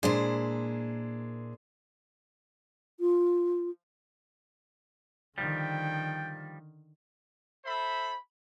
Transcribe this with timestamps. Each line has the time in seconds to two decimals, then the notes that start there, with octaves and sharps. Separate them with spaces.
0.03 A#2 G#3 D4 E4 C5
3.00 F4
5.38 D3 D#3 F3 G3 G5
7.65 A4 C5 E5 B5